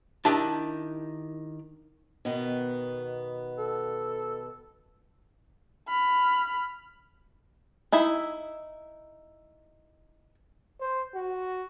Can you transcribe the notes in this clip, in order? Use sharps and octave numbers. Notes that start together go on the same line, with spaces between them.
D#3 D4 E4 G4 A5
B2 D#3 B3
A4
B5 F6
D#4 E4 E5
C5
F#4